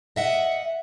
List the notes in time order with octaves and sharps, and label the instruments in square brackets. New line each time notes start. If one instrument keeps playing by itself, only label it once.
[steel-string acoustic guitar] D#5 E5 F#5